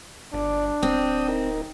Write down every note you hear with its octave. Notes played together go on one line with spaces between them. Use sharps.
G1 D4 D5
D1 C4 G5 D#6
D#4 A#4